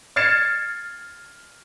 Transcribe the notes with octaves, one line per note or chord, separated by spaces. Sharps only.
F6 G#6 A6 C7 C#7 E7